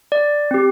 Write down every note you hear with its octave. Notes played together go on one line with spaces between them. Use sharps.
D5
C4 G4